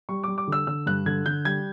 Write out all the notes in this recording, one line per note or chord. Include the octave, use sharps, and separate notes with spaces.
G3 C#6
G3 D6
D6
D3 E6
D3 E6
G2 F#6
D3 G#6
D3 G6
G3 G#6